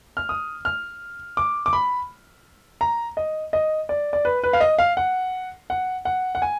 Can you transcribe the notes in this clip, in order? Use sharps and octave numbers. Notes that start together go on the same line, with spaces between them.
F6
D#6
F6
D6
D6
B5
A#5
D#5
D#5
D5
D5
B4
B4
F5
D#5
F5
F#5
F#5
F#5
F#5
G#5